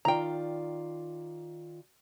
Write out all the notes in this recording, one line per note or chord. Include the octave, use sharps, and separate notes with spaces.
D#3 F4 D5 G5 A#5